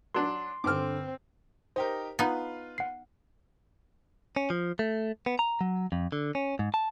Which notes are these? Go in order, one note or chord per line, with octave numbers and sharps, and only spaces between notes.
F#3 D4 C6
G2 D3 C4 D6 F6
D#4 G4 A#4 C5
B3 D#4 F4 B4
F#5 C7
C#4
F3
A3
B3
A#5
F#3
F2
D3
C#4
G#2
A5